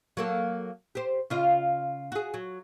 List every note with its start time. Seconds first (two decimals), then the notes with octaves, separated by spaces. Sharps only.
0.17 F#3 A#3 A4
0.95 G4 C5
1.30 C#3 F4 D#5
2.12 F#4 G#4
2.34 F#3